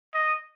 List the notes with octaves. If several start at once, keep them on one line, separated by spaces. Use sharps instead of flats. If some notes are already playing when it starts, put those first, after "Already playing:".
D#5